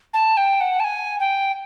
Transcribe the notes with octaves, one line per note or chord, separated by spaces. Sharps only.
A5
G5
F#5
A5
G#5
G5